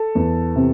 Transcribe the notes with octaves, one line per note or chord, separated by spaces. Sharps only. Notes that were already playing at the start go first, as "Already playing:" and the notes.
Already playing: A4
E2
C3